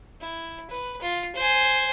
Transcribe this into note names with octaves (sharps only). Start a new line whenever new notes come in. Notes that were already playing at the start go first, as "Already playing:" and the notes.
E4
B4
F4
C5 G#5